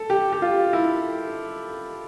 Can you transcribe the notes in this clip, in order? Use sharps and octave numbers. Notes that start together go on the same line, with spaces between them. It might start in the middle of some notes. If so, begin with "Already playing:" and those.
Already playing: A4
G4
G4
F4
E4